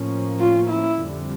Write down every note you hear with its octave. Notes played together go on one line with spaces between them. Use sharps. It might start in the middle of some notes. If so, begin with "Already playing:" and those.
Already playing: A2 F3 A#3 C#4
F4
E4
F2 D3 G3